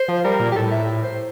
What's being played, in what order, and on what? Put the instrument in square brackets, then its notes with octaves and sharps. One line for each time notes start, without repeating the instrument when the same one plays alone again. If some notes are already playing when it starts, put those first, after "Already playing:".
Already playing: [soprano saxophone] C5
[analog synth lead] F3
[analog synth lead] G3 [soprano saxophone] A#4
[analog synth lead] A#2
[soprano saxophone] G4
[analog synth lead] A2 [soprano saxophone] A4
[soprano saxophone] E5
C5